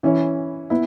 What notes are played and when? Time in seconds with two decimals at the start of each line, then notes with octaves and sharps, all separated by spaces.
0.03 E3 C#4 E4
0.70 B3 E4